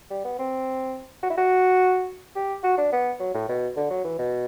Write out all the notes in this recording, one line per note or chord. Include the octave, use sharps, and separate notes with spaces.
G3
B3
C4
F#4
E4
F#4
G4
F#4
D4
B3
F#3
A2
B2
D3
F#3
E3
B2